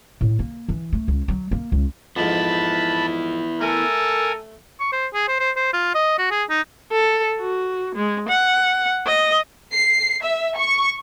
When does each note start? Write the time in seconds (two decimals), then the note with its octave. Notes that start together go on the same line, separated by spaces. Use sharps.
0.21 A2
0.39 A#3
0.69 E3
0.93 A3
1.08 C#2
1.28 F#3
1.51 A#3
1.72 C#2
2.16 F2 G#2 B3 E4 A5 B5
3.61 A3 A4 A#4 G#5
4.80 C#6
4.93 C5
5.14 G#4
5.28 C5
5.40 C5
5.56 C5
5.73 F4
5.95 D#5
6.18 F#4
6.31 G#4
6.50 D#4
6.92 A4
7.40 F#4
7.95 G#3
8.29 F#5
9.06 D#5
9.72 C7
10.21 E5
10.56 C#6